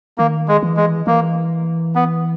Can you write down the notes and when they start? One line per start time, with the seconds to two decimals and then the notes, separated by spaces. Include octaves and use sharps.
0.18 D#3 A#3
0.48 G#3
0.63 E3
0.77 G#3
1.07 E3 A#3
1.95 B3